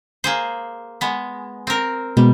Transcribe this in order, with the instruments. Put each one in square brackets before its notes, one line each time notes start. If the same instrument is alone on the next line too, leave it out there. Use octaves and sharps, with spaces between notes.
[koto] A#3 G#4 C5
G#3 B3
C4 A#4
[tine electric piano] B2 G#3 B3 [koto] G3